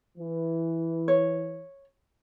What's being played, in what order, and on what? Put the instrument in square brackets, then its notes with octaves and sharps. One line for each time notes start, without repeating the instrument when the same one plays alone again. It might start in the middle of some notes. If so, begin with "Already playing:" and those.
[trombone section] E3
[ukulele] C#5